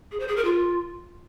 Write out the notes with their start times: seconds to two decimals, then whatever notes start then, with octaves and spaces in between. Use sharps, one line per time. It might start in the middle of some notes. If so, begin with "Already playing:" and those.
0.12 G#4
0.20 C5
0.28 G#4
0.36 A#4
0.45 F4